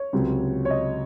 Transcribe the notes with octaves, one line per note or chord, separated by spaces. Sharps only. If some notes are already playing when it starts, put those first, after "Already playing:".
Already playing: C#5
C#2 C3 F#3
C#5
D#5